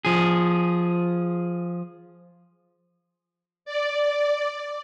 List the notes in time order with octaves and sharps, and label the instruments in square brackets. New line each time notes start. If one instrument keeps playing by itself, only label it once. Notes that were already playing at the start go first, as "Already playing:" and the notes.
[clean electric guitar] F3 G#4
[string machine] D5